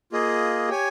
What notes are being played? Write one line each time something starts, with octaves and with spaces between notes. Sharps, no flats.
A#3 F4 G#4 D#5
G4 C#5 G#5